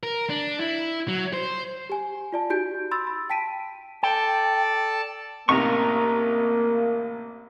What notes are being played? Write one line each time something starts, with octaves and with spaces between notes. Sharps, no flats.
A#4
D4
E4
F#3
C5
G4 G#5
F4 D5 A5
D#4 F#4 G4 G6 D7
B5 C6 E6 A6
B5
G5 A5 B6 D7 D#7
A4 D5 G5 A5
A1 C3 A#3 D#4 A#5 C#6